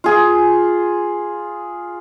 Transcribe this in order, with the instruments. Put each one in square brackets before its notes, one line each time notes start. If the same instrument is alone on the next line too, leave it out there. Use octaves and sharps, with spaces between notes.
[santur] F4 G#4